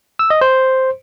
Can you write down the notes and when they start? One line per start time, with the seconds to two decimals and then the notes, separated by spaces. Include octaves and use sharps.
0.19 E6
0.30 D#5
0.41 C5